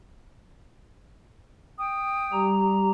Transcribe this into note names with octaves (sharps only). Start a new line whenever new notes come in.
G5 D#6
G3 G4 A#5